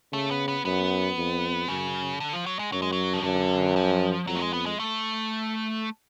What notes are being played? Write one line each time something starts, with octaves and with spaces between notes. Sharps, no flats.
C#3 A3
B3
B3
F#2 B3
F2
F#2 C#3
D3
F3
F#3
G#3
F#2 F#3
G#3
F#3
F3
F#2 D3
F3
F2 F#3
A3
G#3
B3
G#3
A3